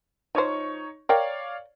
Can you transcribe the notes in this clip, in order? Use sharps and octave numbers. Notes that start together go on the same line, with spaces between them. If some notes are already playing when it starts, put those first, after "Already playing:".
F3 D#4 C5 C#5 C#6
A#4 C#5 D5 F5 G5